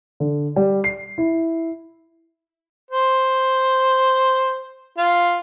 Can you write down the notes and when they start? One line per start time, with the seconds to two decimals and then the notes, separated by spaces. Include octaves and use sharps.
0.20 D3
0.56 G3
0.84 C7
1.18 E4
2.91 C5
4.98 F4